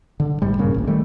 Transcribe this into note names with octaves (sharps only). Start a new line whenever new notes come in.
D3
A1 G#2 G3
D#1 G2 C#3 A#3
A1 D2
D#3 G3 A3